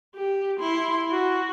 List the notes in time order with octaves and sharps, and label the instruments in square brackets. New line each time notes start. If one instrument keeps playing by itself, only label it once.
[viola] G4
E4 C6
F#4